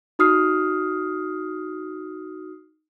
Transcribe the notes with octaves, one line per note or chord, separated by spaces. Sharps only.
D#4 F#4 D#6 F6 C7